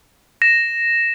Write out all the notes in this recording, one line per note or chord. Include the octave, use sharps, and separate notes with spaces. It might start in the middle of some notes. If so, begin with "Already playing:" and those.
A#6 E7